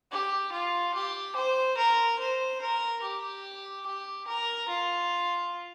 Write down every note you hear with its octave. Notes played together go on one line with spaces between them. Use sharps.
G4
F4
G4
C5
A#4
C5
A#4
G4
G4
A#4
F4